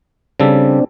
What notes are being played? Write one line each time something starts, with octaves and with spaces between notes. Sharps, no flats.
C#3 G3 C4 D4 A4